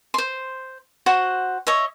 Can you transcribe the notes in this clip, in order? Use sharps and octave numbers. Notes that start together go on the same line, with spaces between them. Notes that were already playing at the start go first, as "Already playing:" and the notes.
C5 C6
F#4 C5 F#5
C#5 D#5 E5